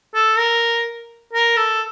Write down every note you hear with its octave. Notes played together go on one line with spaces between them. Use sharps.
A4
A#4
A#4
A4